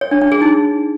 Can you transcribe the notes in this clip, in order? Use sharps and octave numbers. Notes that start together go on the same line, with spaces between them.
C#5
D4
D4
G#4
D#4